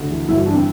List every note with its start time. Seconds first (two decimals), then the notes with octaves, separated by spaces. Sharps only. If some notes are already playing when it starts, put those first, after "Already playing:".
Already playing: D2
0.10 E3
0.28 G1 E4
0.36 F#4
0.46 E3 D4
0.55 C4